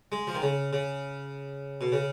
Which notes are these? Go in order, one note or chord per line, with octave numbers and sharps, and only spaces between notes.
G#3
F3
D#3
C#3
C#3
B2
C#3